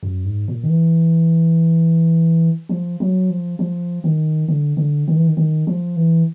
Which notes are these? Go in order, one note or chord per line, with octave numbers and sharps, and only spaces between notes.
F#2
G#2
A#2
D#3
E3
F3
F#3
F3
F3
D#3
D3
D3
D#3
E3
D#3
D#3
F3
E3